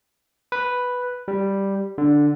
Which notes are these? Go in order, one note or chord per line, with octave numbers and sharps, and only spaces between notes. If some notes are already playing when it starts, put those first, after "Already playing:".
B4
G3
D3